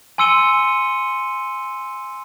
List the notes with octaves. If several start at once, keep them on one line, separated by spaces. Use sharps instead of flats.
G#5 C6 E6 C#7 D#7 G7